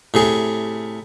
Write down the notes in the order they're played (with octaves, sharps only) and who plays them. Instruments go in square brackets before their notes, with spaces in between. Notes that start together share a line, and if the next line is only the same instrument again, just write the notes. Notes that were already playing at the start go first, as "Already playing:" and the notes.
[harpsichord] A2 C3 G#4